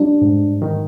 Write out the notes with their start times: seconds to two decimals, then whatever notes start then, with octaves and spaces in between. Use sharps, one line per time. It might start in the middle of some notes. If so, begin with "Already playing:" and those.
Already playing: G3 D4
0.22 G#2
0.62 D#3